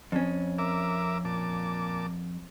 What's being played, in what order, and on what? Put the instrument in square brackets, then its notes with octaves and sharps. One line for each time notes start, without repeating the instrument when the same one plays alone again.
[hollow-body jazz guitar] F2 C#4
[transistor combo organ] A#4 E5 D6
A#2 A5 D6